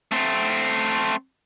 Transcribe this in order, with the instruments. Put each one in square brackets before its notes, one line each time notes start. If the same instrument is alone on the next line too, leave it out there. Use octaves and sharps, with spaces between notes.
[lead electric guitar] A3 C4